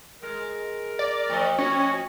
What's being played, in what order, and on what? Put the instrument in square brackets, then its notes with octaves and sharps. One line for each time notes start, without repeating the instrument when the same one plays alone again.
[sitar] G#3 [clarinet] A#4
[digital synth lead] D5
[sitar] A2 F3 D#5
[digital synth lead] C#4 [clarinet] F#4